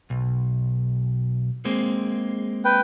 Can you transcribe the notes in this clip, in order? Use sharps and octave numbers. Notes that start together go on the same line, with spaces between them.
B1
G#3 A#3 C4
B4 G5